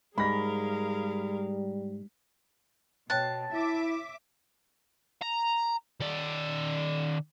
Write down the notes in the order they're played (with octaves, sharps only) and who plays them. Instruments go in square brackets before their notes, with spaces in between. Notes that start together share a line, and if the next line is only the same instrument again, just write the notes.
[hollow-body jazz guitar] G#2 [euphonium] G3 [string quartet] G#4 A#4 F5 [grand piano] B5 A#6
[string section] B2 [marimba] C#5 G5 F#6 [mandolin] A5
[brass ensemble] E4 [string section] E5 D6
[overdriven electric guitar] A#5
D#3 D5